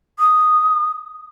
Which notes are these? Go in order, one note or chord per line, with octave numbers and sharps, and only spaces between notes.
D#6